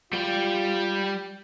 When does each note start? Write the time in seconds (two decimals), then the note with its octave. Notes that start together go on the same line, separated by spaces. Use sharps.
0.13 G3 F4 G5